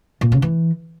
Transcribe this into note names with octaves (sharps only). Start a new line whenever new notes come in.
A#2
C#3
E3